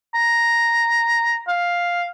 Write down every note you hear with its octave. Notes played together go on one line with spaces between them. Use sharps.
A#5
F5